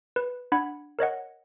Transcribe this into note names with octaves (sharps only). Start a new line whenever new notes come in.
B4
D4 F#5 B5 G#6
A#4 C#5 D#5 F#5